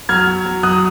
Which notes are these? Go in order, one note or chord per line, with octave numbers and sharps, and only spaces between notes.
F#3 F6 G#6
F#3
F#3
F#3 D#6 F#6